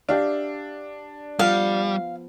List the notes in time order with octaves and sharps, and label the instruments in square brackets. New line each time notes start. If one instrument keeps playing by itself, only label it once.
[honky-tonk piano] D4 [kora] G4 E5 F5
[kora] F3 B3 F#5 [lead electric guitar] G3 [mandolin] F5